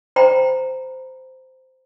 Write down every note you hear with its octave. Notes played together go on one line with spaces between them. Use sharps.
C5 G5 A#5 B5